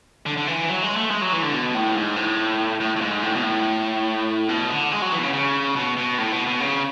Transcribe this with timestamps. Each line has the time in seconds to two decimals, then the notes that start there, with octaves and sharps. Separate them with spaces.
0.26 D3
0.37 D3
0.47 E3
0.69 F#3
0.83 G#3
0.96 A3
1.11 G#3
1.22 F#3
1.32 E3
1.42 D3
1.53 B2
1.74 A2
1.95 G#2
2.16 A2
2.80 A2
2.96 A2
3.01 G#2
3.23 A2
3.35 B2
3.43 A2
4.49 B2
4.70 D3
4.92 G#3
5.02 F#3
5.12 E3
5.19 B2
5.23 C#3
5.33 C#3
5.76 B2
5.97 B2
6.18 A2
6.32 B2
6.46 B2
6.60 C#3